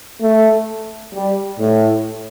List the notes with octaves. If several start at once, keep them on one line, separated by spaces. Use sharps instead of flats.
A3
G3
A2